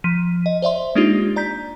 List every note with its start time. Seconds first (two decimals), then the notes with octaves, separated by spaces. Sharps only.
0.04 F3 B6 D#7
0.46 D#5
0.62 C5 D5 E5 C6
0.95 G#3 A#3 D4 D#4 F4 G4
1.36 D5 A#5 G6 B6